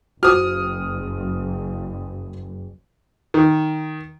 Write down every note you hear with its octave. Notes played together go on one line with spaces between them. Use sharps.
F#1 F#4 C5 D#6 F6
D#3